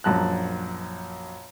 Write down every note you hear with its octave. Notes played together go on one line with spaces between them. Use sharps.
A#1 F#2 A5 F#6